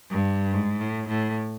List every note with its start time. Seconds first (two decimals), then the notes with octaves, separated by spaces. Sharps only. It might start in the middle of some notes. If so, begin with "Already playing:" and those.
0.10 G2
0.53 G#2
0.81 A2
1.09 A2